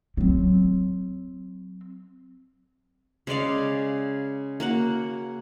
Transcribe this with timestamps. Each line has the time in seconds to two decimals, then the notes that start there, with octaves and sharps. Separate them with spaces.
0.17 F#3 C4
3.27 C#3 G#3 D5 F5
4.60 A#3 F#4 F#5